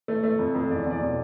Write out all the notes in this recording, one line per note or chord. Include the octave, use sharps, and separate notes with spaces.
A3
A3
F2
F2
E2 D5
E2 D5
B2